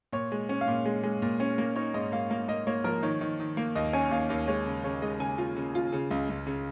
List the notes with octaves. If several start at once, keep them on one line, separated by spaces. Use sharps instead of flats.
A#2 C#5
G#3
C#4
F5
A#2
G#3
G#3
A#2
C#4
A#3
D#4 C#5
G#2 D#5
A#3 F5
A#3 F5
A#3 D#5
A#3 C#5
F3 A#4
D#3 C#5
D#3
D#3
A#3
D#2 D#5
C#4 G#5
D#2 F5
D#2 F5
G#3 C#5
C#3
C#3 C#5
G#3 D#5
C#3 G#5
F4
C#3
F4
C#3
C#2
C#2
C#3